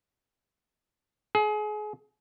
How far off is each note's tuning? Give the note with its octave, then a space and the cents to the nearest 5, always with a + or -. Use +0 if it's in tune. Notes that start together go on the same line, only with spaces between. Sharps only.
G#4 +30